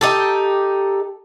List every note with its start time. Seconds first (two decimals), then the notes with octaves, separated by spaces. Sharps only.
0.01 D#4 G4 A4